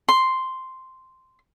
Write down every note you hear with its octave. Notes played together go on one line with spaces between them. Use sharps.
C6